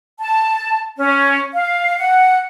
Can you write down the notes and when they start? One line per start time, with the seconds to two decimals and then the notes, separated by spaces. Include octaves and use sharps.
0.19 A5
0.97 C#4
1.53 F5
1.98 F#5